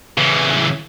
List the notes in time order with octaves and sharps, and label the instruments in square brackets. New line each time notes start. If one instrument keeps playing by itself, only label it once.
[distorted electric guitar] C#3 E3